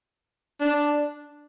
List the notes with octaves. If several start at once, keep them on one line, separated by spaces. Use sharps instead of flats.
D4